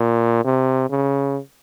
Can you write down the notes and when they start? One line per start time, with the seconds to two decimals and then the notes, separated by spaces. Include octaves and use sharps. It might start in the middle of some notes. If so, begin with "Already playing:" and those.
Already playing: A#2
0.44 C3
0.90 C#3